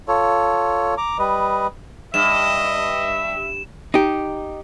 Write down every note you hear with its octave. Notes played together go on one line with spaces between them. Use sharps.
F4 A4 C#5
A#5 D6
G3 B4 D#5
G2 D#5 E5 E7
D#4 G4